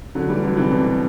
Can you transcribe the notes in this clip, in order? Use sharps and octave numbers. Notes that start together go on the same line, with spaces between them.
D3 F#3
E3 G3
D3 F#3
C3 E3
B2
B2